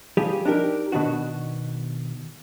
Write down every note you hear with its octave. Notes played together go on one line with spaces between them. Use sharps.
F3 G3 G4 G#4
D4 D#4 G4 A#4
B2 D#3 D4 F#4